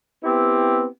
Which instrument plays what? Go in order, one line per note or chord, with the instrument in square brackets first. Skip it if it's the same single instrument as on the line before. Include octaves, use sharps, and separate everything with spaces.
[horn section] B3 C4 E4 G4